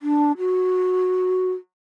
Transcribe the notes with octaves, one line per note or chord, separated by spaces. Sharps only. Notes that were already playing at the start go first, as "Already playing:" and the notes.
D4
F#4